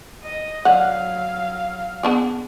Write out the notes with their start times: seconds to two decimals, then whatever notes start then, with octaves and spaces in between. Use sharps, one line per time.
0.23 D#5
0.65 D3 F#3 F5 F#5
2.03 B3 D4 G#4